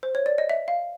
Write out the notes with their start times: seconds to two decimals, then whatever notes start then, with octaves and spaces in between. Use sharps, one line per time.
0.03 C5
0.15 C#5
0.26 D5
0.38 D#5
0.49 E5
0.68 F5